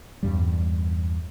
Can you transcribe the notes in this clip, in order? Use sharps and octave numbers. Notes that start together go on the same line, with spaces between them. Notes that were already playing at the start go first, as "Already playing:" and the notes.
E2 G2 G3